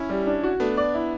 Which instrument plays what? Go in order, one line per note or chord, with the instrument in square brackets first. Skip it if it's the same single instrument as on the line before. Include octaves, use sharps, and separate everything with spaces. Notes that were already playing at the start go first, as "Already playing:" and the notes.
Already playing: [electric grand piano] C#4 E4
[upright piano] G3
D4
F#4
[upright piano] A3 [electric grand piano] B3 D4
[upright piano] D5
E4